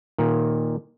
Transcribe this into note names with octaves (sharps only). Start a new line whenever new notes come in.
A#2 D#3